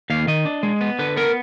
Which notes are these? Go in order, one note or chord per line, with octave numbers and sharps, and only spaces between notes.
D#2 F5
D#3 D#5
D4
G#3
B3
D3 B4
B3 A#4